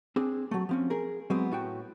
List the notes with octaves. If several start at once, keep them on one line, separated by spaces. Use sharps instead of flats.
C4 D4 G#4
F#3 A3
F3 C4 C#4
G#4 A#4
F#3 G#3 B3 C4
A2 F#4 G5